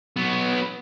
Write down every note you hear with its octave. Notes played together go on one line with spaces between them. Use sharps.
F#3 B3